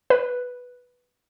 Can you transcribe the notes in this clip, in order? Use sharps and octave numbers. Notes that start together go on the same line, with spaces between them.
B4